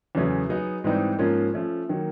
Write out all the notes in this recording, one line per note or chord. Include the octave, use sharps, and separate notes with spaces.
E2 C#3 F#3 A3 C#4
F#3 B3 D#4 G#4
G#2 E3 G3 C4 D#4
G#2 F3 A#3 C#4 F4
F3 A3 C#4
D#3 F#3 A#3